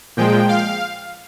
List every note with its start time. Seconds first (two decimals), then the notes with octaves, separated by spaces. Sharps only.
0.17 A#2 F3 G#3 G5
0.49 F5